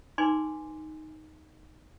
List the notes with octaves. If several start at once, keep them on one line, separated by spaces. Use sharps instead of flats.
D#4 B4 G#5 C6 D6